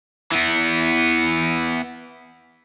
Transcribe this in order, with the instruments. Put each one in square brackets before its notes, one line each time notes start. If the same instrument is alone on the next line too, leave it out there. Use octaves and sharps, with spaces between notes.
[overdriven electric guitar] E3 B3